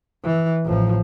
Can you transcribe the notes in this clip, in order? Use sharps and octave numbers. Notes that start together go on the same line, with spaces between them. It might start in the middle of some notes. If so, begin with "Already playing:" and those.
E3
A1 F3